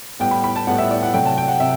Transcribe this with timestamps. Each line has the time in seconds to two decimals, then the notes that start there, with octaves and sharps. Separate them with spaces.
0.19 A2 G3 B3 G5
0.31 B5
0.44 B5
0.56 A5
0.67 A2 G3 B3 F#5
0.78 E5
0.91 D5
1.03 F#5
1.13 C3 F#3 A3 G5
1.26 A5
1.37 G5
1.48 F#5
1.60 C3 E5